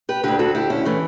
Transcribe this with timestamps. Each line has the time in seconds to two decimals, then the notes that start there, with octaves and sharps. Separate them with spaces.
0.09 G4 B4
0.24 D2 D3 G4 B4
0.39 F#4 A4
0.55 E4 G4
0.70 C#4 E4
0.85 E3 A3 C#4